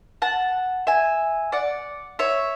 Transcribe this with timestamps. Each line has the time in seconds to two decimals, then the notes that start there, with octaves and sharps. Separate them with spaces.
0.22 F#5 A5
0.87 E5 G#5
1.52 D5 F#5
2.19 C#5 E5